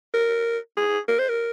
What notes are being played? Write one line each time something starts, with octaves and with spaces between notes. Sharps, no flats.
A#4
G#4
A#4
C5
A#4